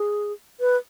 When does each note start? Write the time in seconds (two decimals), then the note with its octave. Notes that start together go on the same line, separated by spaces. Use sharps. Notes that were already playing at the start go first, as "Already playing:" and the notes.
Already playing: G#4
0.60 B4